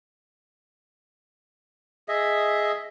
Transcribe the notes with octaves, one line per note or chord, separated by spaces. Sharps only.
G#4 D#5 E5